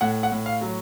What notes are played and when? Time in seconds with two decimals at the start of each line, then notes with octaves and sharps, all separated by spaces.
0.01 A2 F#5
0.23 F#5
0.32 A2
0.46 F5
0.61 F#3